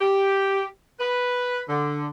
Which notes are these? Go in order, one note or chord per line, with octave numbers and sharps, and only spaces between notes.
G4
B4
D3